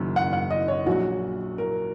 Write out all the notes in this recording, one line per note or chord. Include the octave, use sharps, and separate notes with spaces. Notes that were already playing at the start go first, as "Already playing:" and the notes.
Already playing: F#1 F#2 D#3 F#3
F#5
F#5
D#5
C#5
A#1 A#2 F#3 F#4
A#4